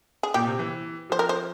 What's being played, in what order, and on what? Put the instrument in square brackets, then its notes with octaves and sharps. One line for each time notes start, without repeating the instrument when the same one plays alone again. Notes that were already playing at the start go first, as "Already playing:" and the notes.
[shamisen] G#4
[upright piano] A#2 [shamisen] G4
[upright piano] C3
E3
[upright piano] F3 [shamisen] C5
[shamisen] A#4
C5